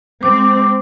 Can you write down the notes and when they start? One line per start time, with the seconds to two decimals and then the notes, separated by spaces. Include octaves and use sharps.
0.23 G#3 C4 D6